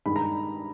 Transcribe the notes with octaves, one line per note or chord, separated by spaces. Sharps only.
G2 D#3 G#3 D#4 B5
A#5